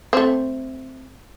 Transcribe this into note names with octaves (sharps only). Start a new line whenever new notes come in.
A3 C4